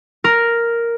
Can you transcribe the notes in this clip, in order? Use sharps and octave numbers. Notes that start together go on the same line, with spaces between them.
A#4